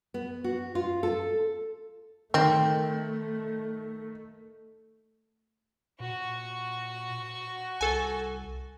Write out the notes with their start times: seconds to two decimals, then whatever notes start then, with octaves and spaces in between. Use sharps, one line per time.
0.14 B3
0.44 F#4
0.75 F4
1.03 A4
2.34 D#3 A3 C4
6.00 A#2 F#4 C#6
7.81 C2 A4 G#5